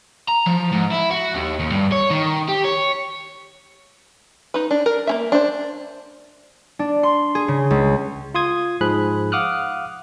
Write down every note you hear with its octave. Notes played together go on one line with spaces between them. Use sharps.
A#5
F3
G#2
E4
F#4
D#2
D#2
G2
C#5
D#3
G4
C#5
D#4 B4
D4
A#4
A#3 C#4 E5
D4 C5
D4
C6
G#4
C#3
C#2
F4 C6 D#6 G#6
G#2 F3 G#4 B5 F#6
F5 F#5 D6 D#6 F6 F#6